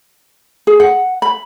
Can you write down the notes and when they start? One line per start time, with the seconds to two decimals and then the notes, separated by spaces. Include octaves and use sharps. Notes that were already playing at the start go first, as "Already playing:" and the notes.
0.67 G#4
0.80 F#5
1.22 B5